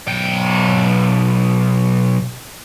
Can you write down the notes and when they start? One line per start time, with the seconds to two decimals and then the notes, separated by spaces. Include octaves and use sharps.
0.08 B1 G5